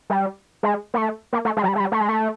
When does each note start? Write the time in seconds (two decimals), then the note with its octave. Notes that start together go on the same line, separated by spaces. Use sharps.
0.10 G3
0.63 G#3
0.94 A#3
0.98 A3
1.33 A#3
1.45 A3
1.57 G#3
1.64 F#3
1.68 G3
1.76 G#3
1.80 G3
1.92 A3
2.01 G#3
2.09 A3